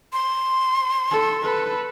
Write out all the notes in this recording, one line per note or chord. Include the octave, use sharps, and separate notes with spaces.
C6
A4
A4 B4